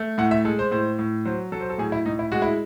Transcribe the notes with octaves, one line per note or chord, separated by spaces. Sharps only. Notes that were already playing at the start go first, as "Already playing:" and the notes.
Already playing: A3
A2 F#5
E5
G#3 A4
C5
A2 C5
A2
F#3 C5
F#3 A4
C5
A4
A2 G#4
E4
A2 D#4
E4
G#3 F#4
E4